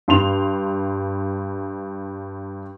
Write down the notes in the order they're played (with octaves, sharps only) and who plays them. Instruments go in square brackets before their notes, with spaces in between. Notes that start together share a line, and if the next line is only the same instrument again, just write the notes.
[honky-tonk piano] G2 C6 F7